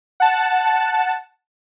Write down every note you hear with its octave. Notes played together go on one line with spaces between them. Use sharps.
F#5 A5